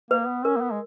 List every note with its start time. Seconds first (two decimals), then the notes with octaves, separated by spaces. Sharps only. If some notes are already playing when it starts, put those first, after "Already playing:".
0.11 A#3 B4
0.28 B3
0.45 C#4 A#4
0.57 A#3
0.61 B3
0.71 G#3